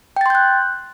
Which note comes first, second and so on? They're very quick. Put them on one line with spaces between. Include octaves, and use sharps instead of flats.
G5 A6 C6 G6 F#6